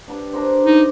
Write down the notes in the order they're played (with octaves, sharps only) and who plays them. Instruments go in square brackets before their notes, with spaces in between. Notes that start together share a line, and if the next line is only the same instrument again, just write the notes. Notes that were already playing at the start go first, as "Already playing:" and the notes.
[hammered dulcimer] D4 G4 B4
D4 A#4 C5
[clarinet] D#4